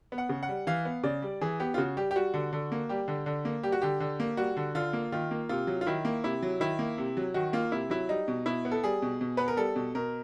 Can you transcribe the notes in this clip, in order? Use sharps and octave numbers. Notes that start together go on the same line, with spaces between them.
B3
F#5
C#3
F#5
G3
E3 F5
B3
C#3 D5
G3
E3 G#4
B3 G4
F4
C#3 F#4
G3 G4
G4
G3 F#4
D3
D3
A#3
G3 G4
D3
D3
A#3
G3 G4
F#4
D3 G4
D3
A#3
G3 F#4
D3
D3 F4
A#3
D#3 F4
A#3
C3 F4
F#3
F4
D#3 E4
A#3
C3 E4
F#3
D#3 E4
A#3
C3
F#3
D#3 F#4
A#3 F4
C3 E4
F#3 E4
G3 D#4
B2
B2 E4
B3
A4
G3 G#4
B2
B2
B3 B4
A#4
G3 A4
B2
B2 A#4